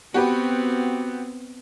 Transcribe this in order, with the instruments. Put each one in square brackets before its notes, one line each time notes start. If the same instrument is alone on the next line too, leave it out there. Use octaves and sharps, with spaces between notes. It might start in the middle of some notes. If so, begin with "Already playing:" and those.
[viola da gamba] B3 C4 [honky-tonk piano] F#4 G4 B4